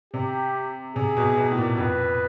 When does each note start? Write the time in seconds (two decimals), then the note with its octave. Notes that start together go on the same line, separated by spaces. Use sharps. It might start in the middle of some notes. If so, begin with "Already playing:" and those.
0.14 C3 G4
0.95 C3 G#4
1.17 B2
1.37 B2
1.51 A2
1.58 A#2
1.77 F2 B4